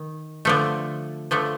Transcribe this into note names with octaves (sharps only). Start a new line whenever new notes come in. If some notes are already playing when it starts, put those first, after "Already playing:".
Already playing: D#3
D3 F3 A3
D3 F3 A3